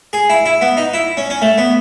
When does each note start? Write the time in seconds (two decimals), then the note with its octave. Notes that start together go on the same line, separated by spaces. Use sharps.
0.13 G#4
0.30 E4
0.46 E4
0.61 B3
0.77 D#4
0.94 E4
1.17 C#4
1.30 C#4
1.42 A3
1.58 B3